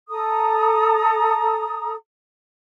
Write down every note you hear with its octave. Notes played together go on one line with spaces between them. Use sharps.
A4 A#5 D#6